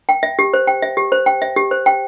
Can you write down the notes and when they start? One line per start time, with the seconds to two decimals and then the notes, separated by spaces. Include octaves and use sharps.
0.09 G5
0.23 E5
0.39 G4
0.54 C5
0.67 G5
0.82 E5
0.97 G4
1.12 C5
1.26 G5
1.42 E5
1.56 G4
1.71 C5
1.86 G5